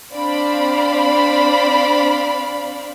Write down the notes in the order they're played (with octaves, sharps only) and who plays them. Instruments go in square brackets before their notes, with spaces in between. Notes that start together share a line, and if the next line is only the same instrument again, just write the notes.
[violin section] C4 D4 C5 D5 F5 B5